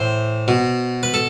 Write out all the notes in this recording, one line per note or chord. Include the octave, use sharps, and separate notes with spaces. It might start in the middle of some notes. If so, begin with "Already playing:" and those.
Already playing: A2 E3 C5
B2
B4
A4